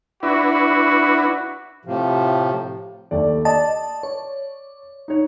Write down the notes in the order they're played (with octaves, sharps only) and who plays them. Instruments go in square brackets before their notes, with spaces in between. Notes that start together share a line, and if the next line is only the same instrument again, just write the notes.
[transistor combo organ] D4 E4 B4 [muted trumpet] F#4
[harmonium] A2 C3 F3
[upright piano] D#2 A3 D5
[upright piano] D5 [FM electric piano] D#5 A5
[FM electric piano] C#5
[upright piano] D#4 C#5